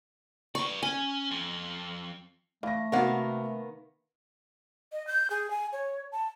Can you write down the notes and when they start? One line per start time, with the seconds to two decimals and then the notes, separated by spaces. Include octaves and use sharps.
0.55 B4 D5 C#6
0.83 C#4 G#5
1.31 F2
2.63 E3 A3 F5 A#6
2.92 C3 D#3 A#3 B3 F#4 A#4 F#5
4.92 D#5
5.07 G6
5.30 G#4
5.51 G#5
5.73 C#5
6.12 A5